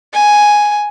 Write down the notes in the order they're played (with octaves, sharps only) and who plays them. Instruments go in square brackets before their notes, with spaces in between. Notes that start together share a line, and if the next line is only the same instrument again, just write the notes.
[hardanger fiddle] G#5